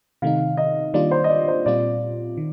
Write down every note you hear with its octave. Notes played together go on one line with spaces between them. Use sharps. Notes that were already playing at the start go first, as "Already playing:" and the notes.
C3 D#3 A3 D#4 F5
D#5
D#3 G3 A#3 D4 F4 D5
C5
D#5
D5
C5
A#2 G3 C4 F4 D5
D#3